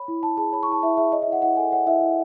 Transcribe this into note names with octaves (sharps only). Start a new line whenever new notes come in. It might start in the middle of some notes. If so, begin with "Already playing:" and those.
Already playing: C#5 B5
E4
E4 A5
G#4 A5
C#5 B5
C#6
E4 A5
E4 E5
G#4 E5
C#5 D#5
E5
E4 F#5
E4 F#5
A4 G#5
C#5 F#5
E4 E5
E4